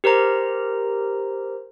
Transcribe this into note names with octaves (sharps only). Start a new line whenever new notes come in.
G4 A#4 C5 A#5